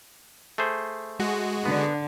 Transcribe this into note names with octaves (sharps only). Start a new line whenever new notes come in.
A3 G#4 C5
G#3 F#4
D3 B3